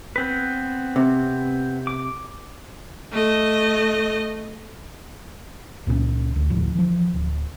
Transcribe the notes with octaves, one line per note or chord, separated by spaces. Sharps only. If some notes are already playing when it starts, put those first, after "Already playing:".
B3 C4 B4
C3
D6
A3 D#5
C#2 A#2 A3 C#4
D2
F1 D2 A2 F3
E3 F3
D1